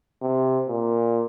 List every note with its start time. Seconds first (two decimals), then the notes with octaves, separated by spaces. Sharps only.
0.22 C3
0.69 A#2